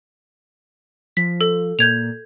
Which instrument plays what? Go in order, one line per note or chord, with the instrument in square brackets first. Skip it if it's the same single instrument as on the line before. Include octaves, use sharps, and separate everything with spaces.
[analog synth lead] F3 [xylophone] B6
[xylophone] A4
[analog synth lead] A#2 [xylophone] G6 G#6 F7